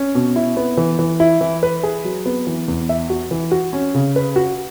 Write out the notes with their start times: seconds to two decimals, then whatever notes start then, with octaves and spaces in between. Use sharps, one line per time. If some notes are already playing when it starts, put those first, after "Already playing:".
Already playing: C#4
0.15 B2
0.36 E4
0.57 B3
0.77 E3
0.99 E3
1.20 E4
1.41 E3
1.63 B4
1.83 G#4
2.04 F#3
2.26 B3
2.47 E3
2.68 E2
2.89 E5
3.10 F#4
3.31 E3
3.51 F#4
3.73 C#4
3.95 C#3
4.16 B4
4.36 F#4